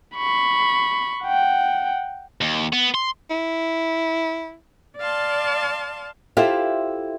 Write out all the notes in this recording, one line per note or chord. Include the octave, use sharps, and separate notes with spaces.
B5 C#6
F#5 G5
D#2
B3
C6
E4
D5 F5 A5 C6
E4 F4 G4 A4 C5 F5